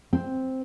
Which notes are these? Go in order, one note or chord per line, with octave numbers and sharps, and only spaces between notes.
C4